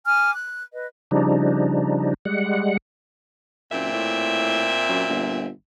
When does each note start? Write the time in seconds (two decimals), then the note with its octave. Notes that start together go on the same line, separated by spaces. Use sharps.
0.06 G#5 D6 F6
0.34 F#6
0.73 B4 D#5
1.11 C#3 F3 G3 D4 D#4
2.25 G3 G#3 F#5
3.72 F#1 A#2 C4 E5
3.93 A2
4.88 F#2
5.09 G1